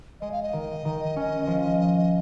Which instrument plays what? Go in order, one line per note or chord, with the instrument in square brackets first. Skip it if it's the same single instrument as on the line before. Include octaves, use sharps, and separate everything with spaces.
[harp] G#3 [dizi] D#5
[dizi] F5
D#5
[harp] D#3
D#3
C#4
F3